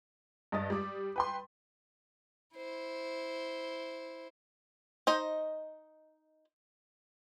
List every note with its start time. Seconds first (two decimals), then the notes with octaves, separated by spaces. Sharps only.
0.52 G2 D#5 D#6 A6
0.70 G3 D6
1.16 B4 G5 C6
2.56 E4 C5
5.07 D#4 C5 D#5